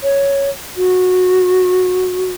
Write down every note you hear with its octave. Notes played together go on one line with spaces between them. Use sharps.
C#5
F#4